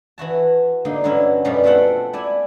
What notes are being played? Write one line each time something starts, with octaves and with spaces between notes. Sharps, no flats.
E3 E4 F#4 A5
D3 A#3 D#4
G2 D3 F#3 B3 C#4 E4
F#2 B2 F3 G3
A3 C4 F4 A4 F#5 G5
E4 D5 G#5 B5